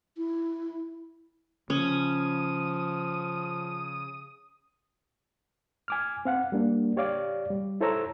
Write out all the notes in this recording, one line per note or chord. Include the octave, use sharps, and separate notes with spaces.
E4
C#3 F3 C#4 D#6
G#5 D6 F6
C4 F5 F#5
G3 A#3 D4
G4 C#5 D5 F5 D6
G3
E4 A4 C5 C#5 A#5 E6